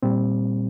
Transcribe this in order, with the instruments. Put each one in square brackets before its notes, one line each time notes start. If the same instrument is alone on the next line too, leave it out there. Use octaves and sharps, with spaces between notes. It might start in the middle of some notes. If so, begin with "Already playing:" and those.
[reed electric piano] A#2 G3 C4